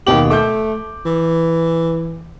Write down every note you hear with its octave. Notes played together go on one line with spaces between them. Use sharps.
D#2 B2 G4 F#7
A3 D6 G6
E3